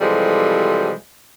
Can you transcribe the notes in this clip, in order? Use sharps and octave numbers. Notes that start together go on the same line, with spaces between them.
C3 E3 F3 G3 G#3 A4